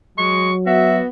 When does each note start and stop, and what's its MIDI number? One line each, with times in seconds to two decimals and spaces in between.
0.18 1.01 54
0.18 0.50 56
0.18 0.53 85
0.67 1.08 59
0.67 1.03 66
0.67 0.98 76